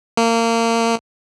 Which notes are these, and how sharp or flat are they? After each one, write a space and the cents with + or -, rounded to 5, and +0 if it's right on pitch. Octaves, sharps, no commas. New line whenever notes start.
A#3 -25